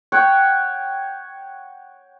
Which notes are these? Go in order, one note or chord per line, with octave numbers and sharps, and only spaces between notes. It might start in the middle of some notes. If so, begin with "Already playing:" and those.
C#5 F#5 G5